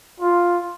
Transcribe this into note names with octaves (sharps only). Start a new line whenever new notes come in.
F4